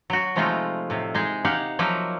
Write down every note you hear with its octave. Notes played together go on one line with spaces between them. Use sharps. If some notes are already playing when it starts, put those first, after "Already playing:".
F#3 F#4
C3 F3 G#3 A3 D#4 F4
A2 C3
G#3 D#4 G#4
D#4 G4 F5 F#5
F3 F#3 A#3 D#4 E5